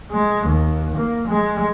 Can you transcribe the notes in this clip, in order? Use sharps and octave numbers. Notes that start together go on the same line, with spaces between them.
G#3
D#2
A#3
G#3